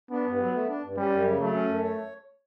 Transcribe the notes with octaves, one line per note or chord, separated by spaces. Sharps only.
B3 D4
G2
F#3
A3
D4
G2
G3 C#4
F#2
C#3
F#3 A3
C#4
F#2
C#5